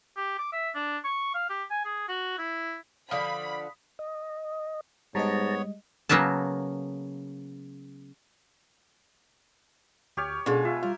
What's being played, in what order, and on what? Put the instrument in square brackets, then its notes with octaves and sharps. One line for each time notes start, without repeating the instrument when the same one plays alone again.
[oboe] G4
D6
E5
D4
C#6
F5
G4
G#5
G#4
F#4
E4
[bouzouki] D3 F3 [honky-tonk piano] D5 F5 [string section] B5 [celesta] D#6 B6
[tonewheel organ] D#5
[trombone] G#2 [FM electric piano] G3 G#3 D#5 [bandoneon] B3 C#5 [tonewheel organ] A5 A#5
[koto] C#3 F#3 A#3 B3 A5
[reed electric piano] D2 F6 [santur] G4 C#5
[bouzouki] B2 G#3 [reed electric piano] C#4 D4 A4 [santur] F4
[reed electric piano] F4 [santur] E5
[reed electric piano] G3 F4 [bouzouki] A#4